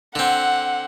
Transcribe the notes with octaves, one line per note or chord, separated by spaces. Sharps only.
D3 C4 F#5